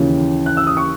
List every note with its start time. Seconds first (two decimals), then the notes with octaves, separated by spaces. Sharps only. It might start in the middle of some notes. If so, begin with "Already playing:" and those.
Already playing: D#2 C#3 E3
0.46 F#6
0.57 E6
0.67 D#6
0.77 C#6